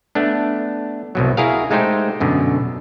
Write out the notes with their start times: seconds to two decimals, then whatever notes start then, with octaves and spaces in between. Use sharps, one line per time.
0.15 A3 B3 D4
1.15 C2 B2 F#3
1.37 E4 F#4 G#4 A#4 F5
1.71 G#3 A3 D#4 G4 C5
2.20 F#2 B2 D3